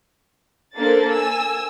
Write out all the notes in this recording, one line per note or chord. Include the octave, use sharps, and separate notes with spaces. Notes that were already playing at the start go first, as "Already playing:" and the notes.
A#3 D4 A4 C5 A6
G#5 E6